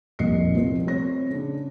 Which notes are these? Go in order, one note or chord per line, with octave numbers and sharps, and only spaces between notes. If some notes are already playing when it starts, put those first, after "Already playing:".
F1 C2 A#2 D#5 C7 C#7
F3 A3 C4
C4 C#5 A#6
C#3 D4